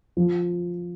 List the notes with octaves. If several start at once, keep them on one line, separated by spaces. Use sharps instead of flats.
F3